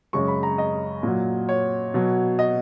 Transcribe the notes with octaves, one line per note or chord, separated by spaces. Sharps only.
F#2 C#3 G#3 C#6
B5
A#5
D#5
A#2 F#3
C#5
B2 F#3
D#5